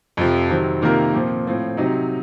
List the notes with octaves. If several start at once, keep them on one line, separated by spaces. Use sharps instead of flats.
F2 C3 F3
C3 D#3 F#3 C4
C3 D#3 A#3 F4 A#4
A#2 F3 C4
A2 F3 C4 F4
C3 F#3 C4 D#4